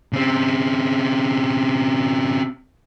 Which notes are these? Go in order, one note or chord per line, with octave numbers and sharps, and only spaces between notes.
C#3 C4